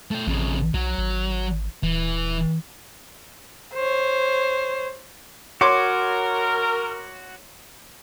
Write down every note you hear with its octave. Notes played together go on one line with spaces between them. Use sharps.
A3 G5
A1 F2 C#3
B1 F#3
G#1
D#1 E3
C5 C#5
F#4 A#4 C#5 C6 D6